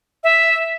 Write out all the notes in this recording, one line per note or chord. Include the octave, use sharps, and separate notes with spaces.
E5